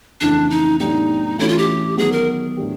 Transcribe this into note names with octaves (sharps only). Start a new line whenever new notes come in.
F2 C#3 E3 A3 C4 D4
D#4
A2 F#3 B3 D4 D#4 G4
E3 A3 C#4 E4 F#4
F4
G4
D#3 F#3 B3 G#4
A#4
A2 F#3 A3 D4 G4